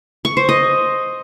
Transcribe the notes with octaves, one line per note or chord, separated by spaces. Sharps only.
C#6
C5
D#5